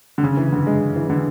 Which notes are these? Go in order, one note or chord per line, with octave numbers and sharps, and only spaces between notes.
D3
C#3
E3
D3
G#3
E3
D3